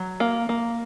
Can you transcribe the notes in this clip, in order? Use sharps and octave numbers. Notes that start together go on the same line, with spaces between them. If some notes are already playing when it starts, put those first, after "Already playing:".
Already playing: F#3
A#3
A#3